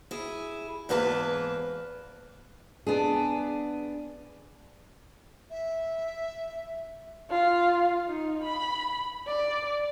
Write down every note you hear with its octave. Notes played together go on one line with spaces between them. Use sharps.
E4 G#4
E2 G#2 A#3 B4 G#5 A5
B3 D4 G#4
E5
F4
D#4
B5
D5